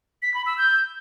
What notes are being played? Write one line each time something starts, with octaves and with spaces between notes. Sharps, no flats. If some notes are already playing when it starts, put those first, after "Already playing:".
B6
B5
E6
G6